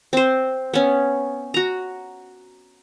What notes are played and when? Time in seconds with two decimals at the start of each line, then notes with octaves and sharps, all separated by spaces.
0.13 C4 C5
0.74 B3 C#4
1.54 F#4 A#5